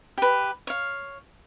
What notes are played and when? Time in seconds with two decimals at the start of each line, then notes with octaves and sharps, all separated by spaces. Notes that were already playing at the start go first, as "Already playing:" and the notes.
0.18 G4 B4
0.67 C#5 F5